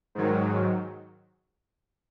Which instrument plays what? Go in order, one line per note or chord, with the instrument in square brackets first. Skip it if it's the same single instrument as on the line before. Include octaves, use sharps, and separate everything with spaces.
[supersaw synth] G#2 D#3 F#3